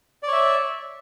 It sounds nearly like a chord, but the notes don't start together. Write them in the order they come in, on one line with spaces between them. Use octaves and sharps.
D5 C#5 E5